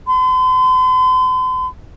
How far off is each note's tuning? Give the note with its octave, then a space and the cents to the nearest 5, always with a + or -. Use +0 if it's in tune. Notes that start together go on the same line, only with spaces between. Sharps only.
C6 -45